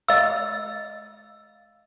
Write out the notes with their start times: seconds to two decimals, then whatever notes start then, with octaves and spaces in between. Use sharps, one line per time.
0.08 D#5 F5 E6